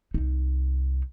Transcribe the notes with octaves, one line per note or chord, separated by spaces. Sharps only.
C2 D#4